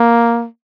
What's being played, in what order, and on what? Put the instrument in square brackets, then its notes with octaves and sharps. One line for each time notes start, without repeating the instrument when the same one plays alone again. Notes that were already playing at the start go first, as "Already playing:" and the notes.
Already playing: [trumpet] A#3